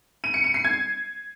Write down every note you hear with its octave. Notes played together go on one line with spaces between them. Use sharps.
D#7
C#7
D#7
C7
G#6